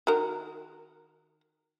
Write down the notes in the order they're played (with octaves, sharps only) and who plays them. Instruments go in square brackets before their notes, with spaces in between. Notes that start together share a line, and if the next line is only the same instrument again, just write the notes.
[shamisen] D#3 F#4 A#4